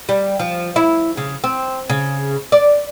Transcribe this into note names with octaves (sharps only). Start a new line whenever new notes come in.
G3
F3
E4
C#3
C4
C#3
D5